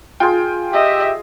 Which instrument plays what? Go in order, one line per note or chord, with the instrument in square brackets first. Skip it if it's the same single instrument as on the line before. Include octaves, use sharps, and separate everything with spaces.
[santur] F4 G#4 [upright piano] G5 C6
[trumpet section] G4 E5 [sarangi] D#5